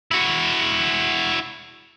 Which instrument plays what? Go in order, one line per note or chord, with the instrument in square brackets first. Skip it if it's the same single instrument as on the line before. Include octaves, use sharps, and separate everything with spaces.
[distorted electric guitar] E4 F#4